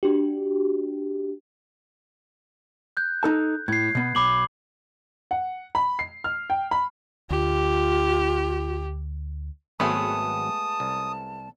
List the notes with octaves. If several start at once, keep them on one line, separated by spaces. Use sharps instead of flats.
D4 F#4 G4
F#6 G6
D#4 A4 A5
A2 G#6 C7
B2 B3
B1 B5 D6 F#7
F#5
B5
C7
F6
G5
B5
D2 F4 G4
G#1 F#3 G#3 A3 B3 B4 A5 D#6
C2